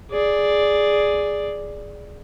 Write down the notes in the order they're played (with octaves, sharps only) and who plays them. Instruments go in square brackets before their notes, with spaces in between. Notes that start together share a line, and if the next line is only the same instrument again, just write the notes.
[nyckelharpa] G#4 D5